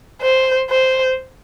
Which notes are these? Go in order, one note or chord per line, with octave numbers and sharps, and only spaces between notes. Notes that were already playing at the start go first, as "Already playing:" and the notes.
C5
C5